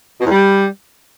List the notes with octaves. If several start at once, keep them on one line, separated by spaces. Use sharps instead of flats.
B2
E2
G3